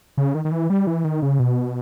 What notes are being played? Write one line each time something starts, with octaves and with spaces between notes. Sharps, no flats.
C#3
D#3
D#3
E3
G3
E3
D#3
C#3
B2